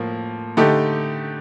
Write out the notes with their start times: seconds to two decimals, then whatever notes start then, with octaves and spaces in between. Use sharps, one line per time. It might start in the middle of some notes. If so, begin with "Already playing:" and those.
Already playing: A2 F3 A#3
0.57 D3 A3 D#4 G4